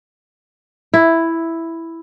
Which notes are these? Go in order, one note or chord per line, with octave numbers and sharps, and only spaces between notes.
E4